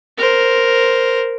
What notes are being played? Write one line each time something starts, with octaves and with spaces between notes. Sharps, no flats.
A#4 C5